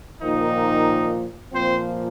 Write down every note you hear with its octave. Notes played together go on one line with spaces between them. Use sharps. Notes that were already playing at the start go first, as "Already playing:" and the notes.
A#2 D#3 F3 D#4
A#2 F3 C4 C5